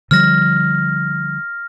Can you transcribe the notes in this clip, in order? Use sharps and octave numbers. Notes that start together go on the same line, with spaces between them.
D3 F3 G3 F6 A#6